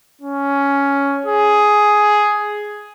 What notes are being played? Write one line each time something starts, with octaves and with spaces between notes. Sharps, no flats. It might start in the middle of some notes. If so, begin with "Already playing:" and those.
C#4
G#4